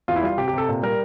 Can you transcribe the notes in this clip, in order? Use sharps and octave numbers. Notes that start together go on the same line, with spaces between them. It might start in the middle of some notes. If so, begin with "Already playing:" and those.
E2 F4
E4
G3 F4
C3 G4
G4
C3 A4
A#2
G3 A#4